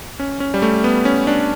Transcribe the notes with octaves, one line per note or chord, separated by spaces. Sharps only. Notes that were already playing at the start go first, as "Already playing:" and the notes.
C#4
C#4
G3
A3
B3
C#4
D4